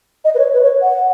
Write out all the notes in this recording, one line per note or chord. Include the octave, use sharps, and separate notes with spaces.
D#5
B4
C#5
B4
C#5
F#5